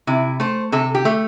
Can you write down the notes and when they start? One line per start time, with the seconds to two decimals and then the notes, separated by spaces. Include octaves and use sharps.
0.07 C3 E4
0.40 A3 C5
0.72 C3 A4
0.95 G4
1.05 A3